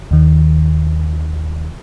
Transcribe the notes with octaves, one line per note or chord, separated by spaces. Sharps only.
D#2 D#3